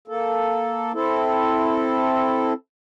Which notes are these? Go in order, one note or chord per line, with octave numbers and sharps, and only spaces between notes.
A#3 A4
C4 E4 A4